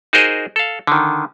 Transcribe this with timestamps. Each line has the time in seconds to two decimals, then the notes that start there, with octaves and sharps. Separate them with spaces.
0.13 D#4 F#4 G#4 A#4 C5 D#5
0.56 A4 F5
0.87 D3 D#3